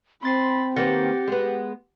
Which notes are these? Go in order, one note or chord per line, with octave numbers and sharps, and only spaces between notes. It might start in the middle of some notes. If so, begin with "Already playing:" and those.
C4 B5 C6 A6 C7
D#3 A#3 B3 G4 F#5 A6 A#6
G#3 B3